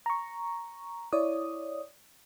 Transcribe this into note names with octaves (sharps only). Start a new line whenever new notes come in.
A#5 C#6
E4 C#5 D5 D#6